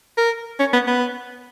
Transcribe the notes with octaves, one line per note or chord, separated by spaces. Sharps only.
A#4
C#4
B3
B3